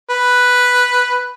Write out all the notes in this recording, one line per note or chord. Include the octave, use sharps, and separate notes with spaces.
B4